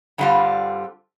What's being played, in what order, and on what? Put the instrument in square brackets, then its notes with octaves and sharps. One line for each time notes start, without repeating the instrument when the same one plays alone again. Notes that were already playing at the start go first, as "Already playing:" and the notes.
[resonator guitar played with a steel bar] G2 D3 G3 C4 F4